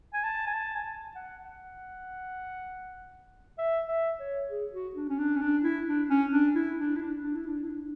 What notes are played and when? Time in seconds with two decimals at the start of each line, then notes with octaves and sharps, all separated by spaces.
0.14 G#5
0.24 A5
0.47 G#5
0.54 A5
0.75 G#5
0.84 A5
1.15 F#5
1.45 F#5
3.58 E5
3.88 E5
4.20 C#5
4.49 G#4
4.73 F#4
4.95 D4
5.09 C#4
5.19 D4
5.36 C#4
5.42 D4
5.64 E4
5.87 D4
6.10 C#4
6.32 D4
6.55 E4
6.79 D4
6.96 E4
7.02 D4
7.23 D4
7.35 E4
7.47 D4
7.64 E4
7.69 D4